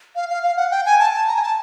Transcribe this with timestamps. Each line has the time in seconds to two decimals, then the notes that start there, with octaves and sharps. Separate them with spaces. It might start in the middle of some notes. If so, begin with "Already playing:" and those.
0.16 F5
0.29 F5
0.43 F5
0.57 F#5
0.71 G5
0.86 G#5
0.99 A5
1.13 A5
1.27 A#5
1.36 G#5
1.42 A5